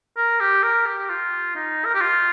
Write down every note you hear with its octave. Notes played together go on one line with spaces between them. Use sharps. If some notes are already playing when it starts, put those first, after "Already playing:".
A#4
G4
A#4
G4
F4
D#4
A#4
G4
F4